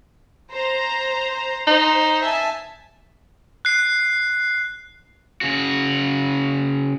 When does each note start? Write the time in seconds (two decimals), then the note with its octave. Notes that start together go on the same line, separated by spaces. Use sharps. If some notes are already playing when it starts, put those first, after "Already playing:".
0.51 C5 A#5
1.67 D#4 C5
2.22 E5 G#5 A5
3.65 F#6 C7
5.41 C#3 F#4